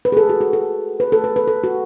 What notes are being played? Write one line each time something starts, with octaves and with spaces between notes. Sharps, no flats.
B4
G#4
A4
F#4
F#4
A4
B4
A4
B4
B4
A4
F#4